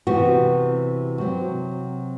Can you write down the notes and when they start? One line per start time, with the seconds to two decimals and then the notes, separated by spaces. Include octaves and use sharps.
0.07 C3 E3 B3 F#4
1.18 C3 F#3 C4 F#4